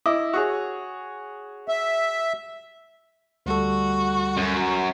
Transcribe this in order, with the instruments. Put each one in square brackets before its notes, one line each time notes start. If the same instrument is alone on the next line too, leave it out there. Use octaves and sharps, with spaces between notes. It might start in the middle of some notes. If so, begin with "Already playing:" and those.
[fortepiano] E4 D#5 D6
F#4 G#4 C#5
[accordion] E5
[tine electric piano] D2 G3 A4 [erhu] F#4
[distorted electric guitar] F#2